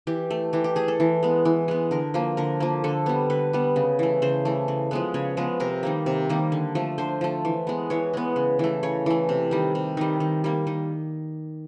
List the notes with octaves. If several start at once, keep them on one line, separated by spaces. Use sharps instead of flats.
E3 G4
A3
E3 G4
G4
A3 G#4
A4
E3
G#3 B3
E3
G#3 B3
D3 A#4
F3 A#3
D3 A#4
F3 A#3
D3 A4
G3 B3
D3 B4
G3 B3
C#3
E3 A3
C#3 C5
E3 A3
C#3
F3 G#3 B3
C#3 C#5
F3 G#3 B3
C3 A#4
D#3 G3 A#3
C3
D#3 G3 A#3
D3
F3 A3
D3 C5
F3 A3
E3
G#3 B3
E3 C#5
G#3 B3
C#3
E3 A3
C#3 C#5
E3 A3
C3
D#3 G3
C3
D#3 G3
D#3
G3 A#3
D#3